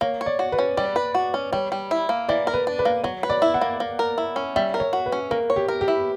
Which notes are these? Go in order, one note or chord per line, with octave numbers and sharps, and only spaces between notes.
A#3 C#5
C#5
D5
F#4
B4
C#4
G3 D5
B4
F#4
C#4
G3 C#5
G3
E4
A#3
E3 D5
A#4
B4
D4
B4
A#3
F#3 C#5
B4
D5
E4
F#5
A#3
A#3
A#4
E4
C#4
G3 E5
A#4
C#5
F#4
B4
C#4
A#3 A#4
C#5
G4
A#4
G4
E4